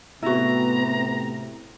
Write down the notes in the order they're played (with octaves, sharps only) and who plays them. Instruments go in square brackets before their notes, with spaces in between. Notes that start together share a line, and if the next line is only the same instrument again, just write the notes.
[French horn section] A2 C3 [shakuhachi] B3 [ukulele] E4 F#4 [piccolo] A#5